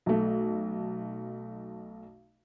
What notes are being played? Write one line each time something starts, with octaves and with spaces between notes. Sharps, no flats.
B1 A3